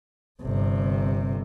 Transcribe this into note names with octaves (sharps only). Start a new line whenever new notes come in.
G1 C3